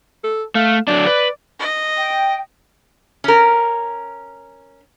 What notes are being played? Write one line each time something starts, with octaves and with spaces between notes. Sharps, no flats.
A4
A3 F5
D3 F#3 D4 D5
B4
D#5
G5
C#4 A#4